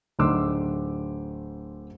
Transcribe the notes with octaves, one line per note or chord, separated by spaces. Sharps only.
D1 D3 D#4 C6 D6 E6